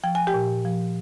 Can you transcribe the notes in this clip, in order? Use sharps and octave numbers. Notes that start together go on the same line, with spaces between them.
F3 G5
G#5
G4 G5
A#2
F3